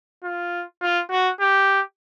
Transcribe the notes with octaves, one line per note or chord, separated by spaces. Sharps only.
F4
F4
F#4
G4